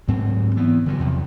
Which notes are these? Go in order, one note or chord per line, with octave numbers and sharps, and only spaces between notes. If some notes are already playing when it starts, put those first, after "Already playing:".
D2 G#2 F#3 C4
E3 B3
D3 F3 F#3
E2 C3